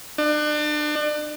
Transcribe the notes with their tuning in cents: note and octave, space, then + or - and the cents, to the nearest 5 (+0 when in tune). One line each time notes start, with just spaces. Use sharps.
D4 +35